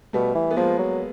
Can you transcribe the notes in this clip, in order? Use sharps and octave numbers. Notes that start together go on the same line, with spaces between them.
B2 G3 A3
E3
B3
F3 G#3 A#3
F#3